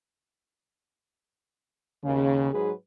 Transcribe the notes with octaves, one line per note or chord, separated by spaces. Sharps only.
D#2 C#3
G#2 F#3 G#4 B4